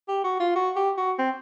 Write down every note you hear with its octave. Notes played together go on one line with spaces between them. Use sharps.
G4
F#4
F4
F#4
G4
F#4
C4